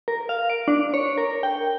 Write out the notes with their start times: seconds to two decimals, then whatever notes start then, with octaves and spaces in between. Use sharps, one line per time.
0.08 A#4
0.29 F5
0.50 D7
0.68 D4
0.94 C#5
1.18 A#4
1.43 G5